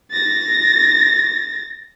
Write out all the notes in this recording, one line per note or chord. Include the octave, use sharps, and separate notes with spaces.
A6 A#6